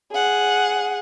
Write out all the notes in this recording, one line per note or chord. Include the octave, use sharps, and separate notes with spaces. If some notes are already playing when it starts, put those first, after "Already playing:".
G#4 F#5